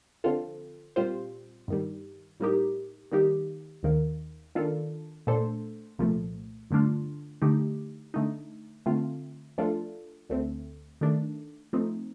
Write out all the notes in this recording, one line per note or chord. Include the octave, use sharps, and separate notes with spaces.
D3 F3 C4 F4 A4
A#2 G3 C4 F4 C5
G2 D#3 G3
A2 G3 A#3 D#4 G4
D#3 G3 A#3 D#4 G4
D#2 D#3 A#3
D#3 A#3 D4 F4 A4
A#2 A3 D4 A4 C5
C2 A#2 F3 A3
G2 D3 A3 D4 F4
D3 A3 D#4 G4
D3 A3 D#4
D3 A3 C4 F4
F3 A3 D4 F4 A4
D2 D3 A3 C4
D#3 A3 D4
F3 A3 C4 D#4